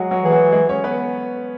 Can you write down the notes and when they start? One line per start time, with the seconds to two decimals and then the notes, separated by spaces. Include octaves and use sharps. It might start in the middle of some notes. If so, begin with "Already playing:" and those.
Already playing: F#3 G#3 F#4 G#4
0.11 F#3 F#4
0.22 E3 G#4
0.32 F#3 F#4
0.52 G#3 G#4
0.69 C#4 C#5
0.84 B3 B4